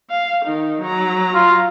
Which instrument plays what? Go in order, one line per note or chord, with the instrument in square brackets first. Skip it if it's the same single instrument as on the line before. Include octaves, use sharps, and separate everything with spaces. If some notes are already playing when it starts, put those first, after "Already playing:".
[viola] F5
D#3 D#4
F#3 A#5
[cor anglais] F4